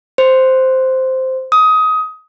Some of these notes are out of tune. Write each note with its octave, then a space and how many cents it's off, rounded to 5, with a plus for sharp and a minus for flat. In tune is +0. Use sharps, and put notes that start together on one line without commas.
C5 -5
D#6 +20